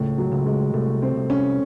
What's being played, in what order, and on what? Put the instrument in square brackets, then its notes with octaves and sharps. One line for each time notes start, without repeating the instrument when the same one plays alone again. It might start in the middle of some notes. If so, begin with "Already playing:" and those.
Already playing: [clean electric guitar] C#2 [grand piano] A2
[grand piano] F#3
[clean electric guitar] C#2
[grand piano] G#3
[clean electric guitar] C2 [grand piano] A3
[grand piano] C4
[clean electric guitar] C2
[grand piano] C#4